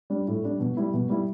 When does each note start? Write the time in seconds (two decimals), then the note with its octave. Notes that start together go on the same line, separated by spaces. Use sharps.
0.10 G3 D4
0.27 A2
0.43 G3 D4
0.60 B2
0.77 G3 E4
0.94 B2
1.09 G3 E4